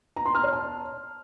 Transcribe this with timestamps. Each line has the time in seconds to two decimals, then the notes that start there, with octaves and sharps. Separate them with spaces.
0.16 A#5
0.26 C6
0.35 F6
0.44 C#5
0.53 A5